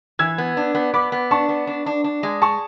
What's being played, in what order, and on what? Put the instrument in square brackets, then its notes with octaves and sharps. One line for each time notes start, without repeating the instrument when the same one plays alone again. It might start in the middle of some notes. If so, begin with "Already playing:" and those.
[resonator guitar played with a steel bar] E3 [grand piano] E6 G#6
[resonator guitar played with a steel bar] B3
D4
B3
[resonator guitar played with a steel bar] B3 [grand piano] B5 D6
[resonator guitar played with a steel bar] B3
[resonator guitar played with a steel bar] D4 [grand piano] A5 C#6
[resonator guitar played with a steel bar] B3
D4
D4
D4
G#3
[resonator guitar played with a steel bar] G#4 [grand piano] A5 C#6